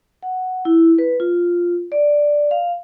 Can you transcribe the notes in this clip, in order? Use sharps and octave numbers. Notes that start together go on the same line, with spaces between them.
F#5
E4
B4
F4
D5
F5